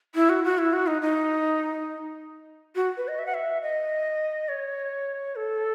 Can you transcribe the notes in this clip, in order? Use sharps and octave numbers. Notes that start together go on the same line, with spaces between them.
E4
F#4
F#4
E4
F#4
D#4
D#4
F#4
B4
D#5
E5
F#5
E5
D#5
C#5
A4